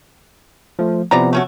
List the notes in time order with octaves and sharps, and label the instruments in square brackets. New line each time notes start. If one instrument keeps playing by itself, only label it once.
[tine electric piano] F3 A3
[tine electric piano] C3 F3 B3 [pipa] E3 D5 A#5
[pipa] A3 C#4 F#4